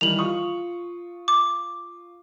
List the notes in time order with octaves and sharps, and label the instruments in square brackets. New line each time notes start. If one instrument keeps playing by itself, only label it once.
[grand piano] D#3 E3 G3 [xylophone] F7 F#7
[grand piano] F4 C#6 D#6
[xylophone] D6